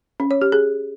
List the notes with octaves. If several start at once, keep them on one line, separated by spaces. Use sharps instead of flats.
C#4
C#5
G4
G#4